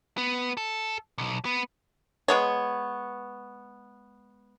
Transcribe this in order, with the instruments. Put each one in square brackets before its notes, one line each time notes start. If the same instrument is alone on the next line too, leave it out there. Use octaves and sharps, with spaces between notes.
[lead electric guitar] B3
A4
B1
B3
[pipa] G#3 B3 C#5